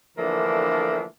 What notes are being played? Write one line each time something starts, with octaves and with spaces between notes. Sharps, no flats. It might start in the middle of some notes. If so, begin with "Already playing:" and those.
D3 E3 F3 A3 A#3 D4